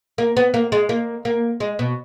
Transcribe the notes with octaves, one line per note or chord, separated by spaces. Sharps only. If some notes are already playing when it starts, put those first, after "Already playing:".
A#3
B3
A#3
G#3
A#3
A#3
G#3
B2